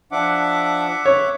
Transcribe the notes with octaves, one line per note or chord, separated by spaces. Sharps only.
F3 D4 E5 F#5 D6
C#5